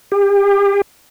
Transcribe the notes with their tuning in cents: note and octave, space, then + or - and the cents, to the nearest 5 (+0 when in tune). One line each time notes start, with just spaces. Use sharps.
G4 +35